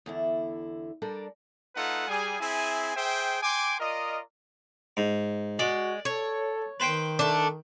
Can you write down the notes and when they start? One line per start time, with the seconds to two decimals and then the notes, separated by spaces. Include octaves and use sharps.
0.06 E2 D3 E4
1.02 G3 D4 A4 A#4 D5
1.76 A3 D#4 F4 A4 B4 F#5
2.08 G3 G#4 G#5
2.40 C4 E4 G#4 E5 G#5
2.96 G#4 C5 E5 G5
3.43 G5 G#5 C6 D6
3.80 F4 A#4 D5 D#5
4.97 G#2
5.59 G#3 F#4 D5
6.05 A4 C#5
6.80 D#3 B4 C5 G5
7.19 A3 D4